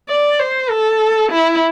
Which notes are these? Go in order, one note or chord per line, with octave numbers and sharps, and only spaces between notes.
D5
C5
A4
E4